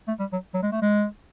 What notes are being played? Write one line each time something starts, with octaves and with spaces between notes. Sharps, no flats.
A3
G3
F#3
F#3
G#3
A3
G#3